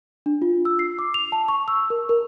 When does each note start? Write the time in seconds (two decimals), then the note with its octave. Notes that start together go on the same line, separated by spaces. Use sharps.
0.26 D4
0.42 F4
0.65 E6
0.79 C7
0.99 D6
1.14 F7
1.32 A5
1.48 C#6
1.68 E6
1.90 A#4
2.09 A#4